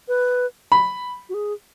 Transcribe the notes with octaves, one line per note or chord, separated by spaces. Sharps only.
B4
B5
F#4
G#4